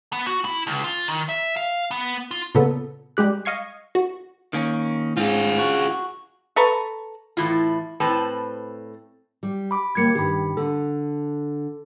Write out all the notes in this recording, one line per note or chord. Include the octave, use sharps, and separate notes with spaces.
B3
F#4
E4
C#2
F4
D#3
E5
F5
B3
F4
A#2 C#3 B3 A4
G3 G#3 G4 F#6
D#5 F5 C#6 G#6 C7
F#4
D#3 A#3 C#4
G#2 C4 F4 G#4
F#4
A4 B4 A#5 C#6
A2 E3 E4 F4
A2 C4 B4 C5 A5
G3
B5 D6
D#2 G3 A#3 G#6 C#7
G2 D#3 G4 B5
D3 A4